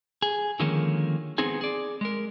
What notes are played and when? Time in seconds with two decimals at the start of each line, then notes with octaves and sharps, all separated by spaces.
0.22 G#4
0.60 D3 D#3 F3 G#3 A#3 C#4
1.38 B3 C4 D#4 G#4 G#5
1.61 G#4 D5
2.01 G#3 A#4